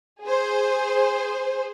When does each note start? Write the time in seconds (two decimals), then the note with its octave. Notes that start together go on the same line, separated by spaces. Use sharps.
0.23 G#4 C5